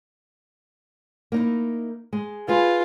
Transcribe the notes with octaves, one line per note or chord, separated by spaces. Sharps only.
A#3 D#4 E4
G#3
F4 G#4 B4 G#5